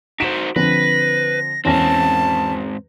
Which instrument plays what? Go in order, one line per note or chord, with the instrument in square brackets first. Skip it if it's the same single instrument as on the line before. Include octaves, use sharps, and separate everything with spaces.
[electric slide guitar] D#4 F#4 C5 [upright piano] B6 D7 E7
[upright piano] D3 F3 C4 [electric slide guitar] B4 [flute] A#6
[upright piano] E2 C#4 A#6 [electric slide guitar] G#2 C4 [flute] A5